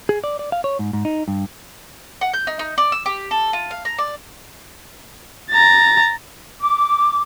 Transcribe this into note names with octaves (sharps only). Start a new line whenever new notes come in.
G#4
D5
D5
F5
C#5
G#2
G#2
D#4
G2
F#5
G6
D#4
D#4
D5
E6
G4
A4
F4
F5
A#5
D5
A#5 A6
D6